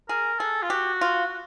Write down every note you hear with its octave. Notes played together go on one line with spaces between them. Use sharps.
G#4 A#4
G#4 A4
F4
F#4 G4
F4